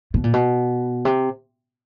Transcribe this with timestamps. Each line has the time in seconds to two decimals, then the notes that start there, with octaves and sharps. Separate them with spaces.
0.14 B2
0.24 A#2
0.34 B2
1.05 C3